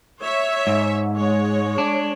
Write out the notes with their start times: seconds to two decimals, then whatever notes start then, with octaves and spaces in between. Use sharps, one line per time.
0.22 C#5 E5
0.67 G#2
1.16 G#3 C#5
1.78 D4